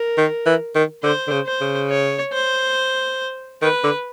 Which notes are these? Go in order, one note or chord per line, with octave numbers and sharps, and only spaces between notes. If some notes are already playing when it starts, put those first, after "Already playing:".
Already playing: A#4
D#3
E3
D#3
D3 C5
D3
C#3
C5
C#3
C#5
C5
D#3 B4
D3